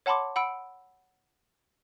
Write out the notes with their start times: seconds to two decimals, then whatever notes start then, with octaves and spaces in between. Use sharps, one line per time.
0.06 C#5 F#5 A5 B5 C6 D6
0.36 F#5 B5 E6 D7